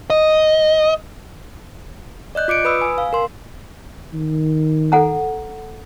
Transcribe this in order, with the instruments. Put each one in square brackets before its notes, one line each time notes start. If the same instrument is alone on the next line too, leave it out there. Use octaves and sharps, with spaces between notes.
[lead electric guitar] D#5
[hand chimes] D5 D#5 F#6 G6
F4 D6 C#7 D7
B4 B5 D#6 E6
G#5
F5
A#4 C6
[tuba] D#3
[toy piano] A4 F#5 A#5